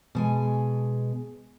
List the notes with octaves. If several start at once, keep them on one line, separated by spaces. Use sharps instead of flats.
B2 G#3 G#5